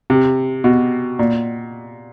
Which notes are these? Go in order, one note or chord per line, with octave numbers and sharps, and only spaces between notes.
C3
B2
A#2